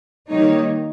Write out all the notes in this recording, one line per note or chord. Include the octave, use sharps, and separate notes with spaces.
D#3 G3 A#3 D#4 C#5